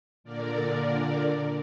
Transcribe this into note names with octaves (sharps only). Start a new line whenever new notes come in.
A#2 D3 A#4 D5